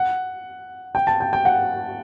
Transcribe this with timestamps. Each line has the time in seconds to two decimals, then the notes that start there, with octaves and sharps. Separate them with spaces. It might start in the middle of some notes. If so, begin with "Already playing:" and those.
Already playing: F#5
0.95 G5
1.07 A5
1.20 G5
1.33 G5
1.45 F#5